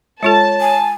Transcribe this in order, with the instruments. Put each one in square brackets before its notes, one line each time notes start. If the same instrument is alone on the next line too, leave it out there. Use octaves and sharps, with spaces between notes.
[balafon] G#3 F4 A4 [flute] C#5 [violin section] A5
[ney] G#5